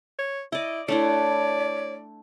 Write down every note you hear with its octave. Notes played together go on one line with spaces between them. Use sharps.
C#5
E4 D5 D#5
A3 D4 E4 C#5 D5